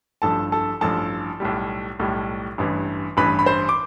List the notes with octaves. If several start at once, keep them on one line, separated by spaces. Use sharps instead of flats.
A1 G2 F3 A4 A5
A4 A5
A1 G2 F3 A4 A5
B1 A2 G3
B1 A2 G3
A1 G2 E3
A1 G2 E3 B4 B5
B5
C5 C6
D6